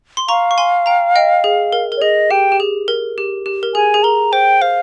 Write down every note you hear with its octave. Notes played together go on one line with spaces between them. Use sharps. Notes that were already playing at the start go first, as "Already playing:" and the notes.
C6
F5 A#5 C#6
C#6
G#5 C6
G5 A#5
D#5 G5
G#4
A#4
A#4
C#5
G#4 D#5
G4 G5
G4
G#4
A#4
G4
G4
A#4
G#4 G#5
G#4
A#4 A#5
C5 G5
C5 F5